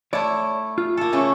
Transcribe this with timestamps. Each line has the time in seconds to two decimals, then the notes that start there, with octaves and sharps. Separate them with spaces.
0.13 A3 E4 C#5 D5
0.78 F4
0.97 A#3 A4
1.12 C#3 A3 C#4